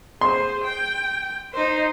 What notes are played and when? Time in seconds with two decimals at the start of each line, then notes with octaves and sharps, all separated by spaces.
0.21 G#4 C5 C6
0.64 G5
1.53 D#4 C5